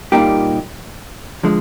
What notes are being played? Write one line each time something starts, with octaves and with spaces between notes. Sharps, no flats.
A#2 G3 A#3 D#4 G4
D3 F3 G#3